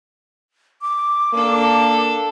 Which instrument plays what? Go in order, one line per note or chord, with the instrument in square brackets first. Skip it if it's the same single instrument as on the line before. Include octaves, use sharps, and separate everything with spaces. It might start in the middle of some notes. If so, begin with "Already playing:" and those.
[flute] D6
[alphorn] A#3 [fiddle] D4 A4